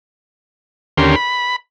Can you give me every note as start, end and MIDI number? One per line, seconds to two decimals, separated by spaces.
0.98 1.15 39
0.98 1.15 50
0.98 1.15 61
0.98 1.15 67
0.98 1.15 70
0.98 1.15 84
1.15 1.56 83